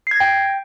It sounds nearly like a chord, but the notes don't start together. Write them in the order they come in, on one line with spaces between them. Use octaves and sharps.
C7 G#6 A#6 G5